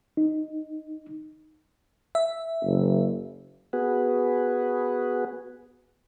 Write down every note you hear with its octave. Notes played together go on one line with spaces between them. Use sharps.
D#4
E5
F#1
B3 F#4 G#4 B4